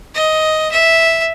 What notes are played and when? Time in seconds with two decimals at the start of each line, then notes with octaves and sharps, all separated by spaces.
0.15 D#5
0.72 E5